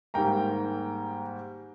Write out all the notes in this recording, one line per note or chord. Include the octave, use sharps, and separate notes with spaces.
G#2 D#3 G3 A#3 G5 A#5